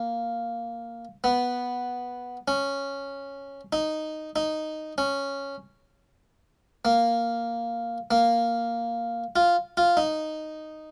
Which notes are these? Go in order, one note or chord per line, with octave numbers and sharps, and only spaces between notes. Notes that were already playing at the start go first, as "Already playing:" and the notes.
Already playing: A#3
B3
C#4
D#4
D#4
C#4
A#3
A#3
F4
F4
D#4